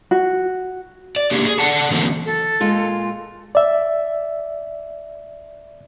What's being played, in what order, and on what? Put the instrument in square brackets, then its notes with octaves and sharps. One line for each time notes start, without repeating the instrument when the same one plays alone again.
[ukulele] F#4
[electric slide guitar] D5
A#3 D4 G4 G#4
G#4
A4 D5 F#5 A5
D3 E3 F#3 A3 A#3 C4
[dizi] A4
[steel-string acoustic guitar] A#2 G#3 F4
[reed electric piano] D5 E5